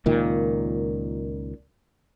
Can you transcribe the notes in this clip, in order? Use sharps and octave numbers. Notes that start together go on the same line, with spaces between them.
C#2 A#2 D#3